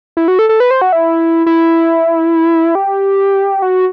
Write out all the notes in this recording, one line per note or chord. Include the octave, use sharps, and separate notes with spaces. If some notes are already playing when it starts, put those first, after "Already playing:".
E4
F#4
A4
A4
B4
C5
F#4
E4
E4
G4
F#4